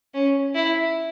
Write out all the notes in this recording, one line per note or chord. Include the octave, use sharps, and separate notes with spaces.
C#4
E4